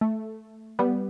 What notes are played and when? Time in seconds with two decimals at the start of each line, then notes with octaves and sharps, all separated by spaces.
0.01 A3
0.79 G3 B3